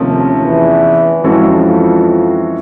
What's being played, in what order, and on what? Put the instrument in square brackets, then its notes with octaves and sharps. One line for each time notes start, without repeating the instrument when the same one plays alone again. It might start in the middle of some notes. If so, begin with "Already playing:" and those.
Already playing: [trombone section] D#2 D#3 [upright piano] C3 F3 A3 C#4
[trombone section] E2 E3
[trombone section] F2 F3 [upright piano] E3 G#3 C#4 F#4 A4